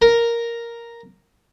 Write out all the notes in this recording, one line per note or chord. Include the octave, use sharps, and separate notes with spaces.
A#4